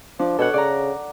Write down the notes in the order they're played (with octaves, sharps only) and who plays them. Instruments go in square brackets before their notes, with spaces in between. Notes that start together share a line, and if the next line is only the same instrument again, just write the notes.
[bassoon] F3 [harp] D4
[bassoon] B2 [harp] A4 C#5 F#5
[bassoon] C#3 [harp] D5 A#5